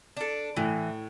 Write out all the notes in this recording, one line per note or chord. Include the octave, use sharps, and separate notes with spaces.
D4 A4
A2 E3